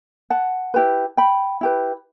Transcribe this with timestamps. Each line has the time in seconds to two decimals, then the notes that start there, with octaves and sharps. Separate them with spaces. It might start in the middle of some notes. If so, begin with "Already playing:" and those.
0.30 F#5 A5
0.74 E4 G4 B4
1.17 G5 B5
1.61 E4 G4 B4